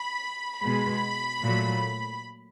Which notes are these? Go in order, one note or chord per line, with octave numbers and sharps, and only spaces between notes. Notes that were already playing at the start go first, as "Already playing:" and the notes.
Already playing: B5
B2 G#3 B5
A#2 F#3 A3